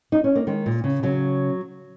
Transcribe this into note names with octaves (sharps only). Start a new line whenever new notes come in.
D#4
C#4
A#3
D#3 G#3
A#2
C#3
C#3 F#3